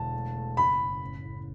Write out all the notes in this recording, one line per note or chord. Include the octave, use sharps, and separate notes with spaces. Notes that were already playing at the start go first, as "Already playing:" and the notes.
Already playing: E1 D3 A5
A3
A3
F#1 B5
F#1
A1
A2